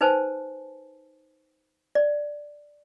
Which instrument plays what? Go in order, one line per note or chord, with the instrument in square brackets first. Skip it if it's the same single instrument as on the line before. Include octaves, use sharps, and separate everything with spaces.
[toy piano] D#4 B4 C5 G#5 A5
D5